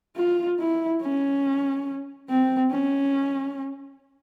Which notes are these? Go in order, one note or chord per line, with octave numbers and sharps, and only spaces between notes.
F4
E4
C#4
C4
C#4